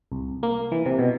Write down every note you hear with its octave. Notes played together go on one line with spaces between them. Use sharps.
C2
A#3
E3
C3
B2